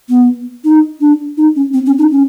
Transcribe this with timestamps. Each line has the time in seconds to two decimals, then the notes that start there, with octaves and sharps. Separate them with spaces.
0.09 B3
0.65 D#4
1.01 D4
1.37 D#4
1.56 C#4
1.74 C4
1.86 C#4
1.98 D#4
2.11 C#4